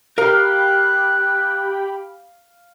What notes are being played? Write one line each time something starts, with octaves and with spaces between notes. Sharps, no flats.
G4 A#4 F5 G5 A#5 B5 F#6